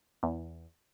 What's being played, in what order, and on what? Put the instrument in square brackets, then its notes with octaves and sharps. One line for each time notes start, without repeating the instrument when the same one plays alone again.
[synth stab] E2